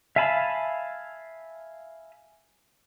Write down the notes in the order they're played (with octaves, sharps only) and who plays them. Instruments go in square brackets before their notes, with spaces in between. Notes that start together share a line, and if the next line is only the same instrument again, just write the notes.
[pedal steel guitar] E5 F5 G#5 A5 B5